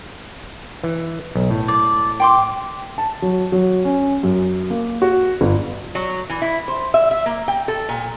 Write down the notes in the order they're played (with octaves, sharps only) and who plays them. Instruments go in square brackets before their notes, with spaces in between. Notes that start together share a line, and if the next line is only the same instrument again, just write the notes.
[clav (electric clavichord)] E3
B1
A2
[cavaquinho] D5
G5 C6 D6
[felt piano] A5
F#3
F#3
C#4
F#2
A#3
F#4
G1
[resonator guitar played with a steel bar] F#3
E3
E4
C5
E5
E5
A#3
G5
A4
A#2